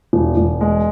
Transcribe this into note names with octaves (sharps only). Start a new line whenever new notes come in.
E1
E1
G#3